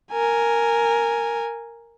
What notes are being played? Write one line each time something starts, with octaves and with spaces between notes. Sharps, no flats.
A#4 G#5